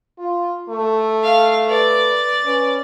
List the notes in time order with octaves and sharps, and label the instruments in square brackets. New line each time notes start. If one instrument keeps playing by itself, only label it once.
[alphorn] F4
A3
[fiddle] F5
[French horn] B4 [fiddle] D5
[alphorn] C#4 [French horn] B4